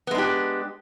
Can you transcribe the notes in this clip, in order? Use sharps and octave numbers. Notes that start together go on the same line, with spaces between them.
G#3 B3 D4 G4